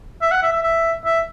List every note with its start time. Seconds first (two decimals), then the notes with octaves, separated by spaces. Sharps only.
0.22 E5
0.31 F#5
0.42 E5
0.53 E5
0.63 E5
1.05 E5